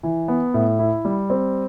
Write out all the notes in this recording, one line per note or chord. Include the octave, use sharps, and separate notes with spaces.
E3
B3
A2
E4
G3
C4